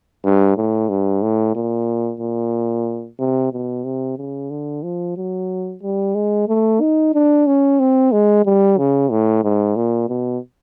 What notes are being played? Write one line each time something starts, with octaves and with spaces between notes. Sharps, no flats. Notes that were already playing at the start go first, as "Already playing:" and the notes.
G2
A2
G2
A2
A#2
A#2
C3
B2
C3
C#3
D3
F3
F#3
G3
G#3
A3
D#4
D4
C#4
C4
G#3
G3
C#3
A2
G#2
A#2
B2